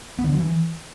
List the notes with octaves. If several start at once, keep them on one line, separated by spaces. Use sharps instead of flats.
B3
D#3
D3
F#3
E3